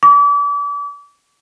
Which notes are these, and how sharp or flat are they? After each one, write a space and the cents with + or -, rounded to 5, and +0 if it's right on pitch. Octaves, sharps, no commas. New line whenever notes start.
D6 -35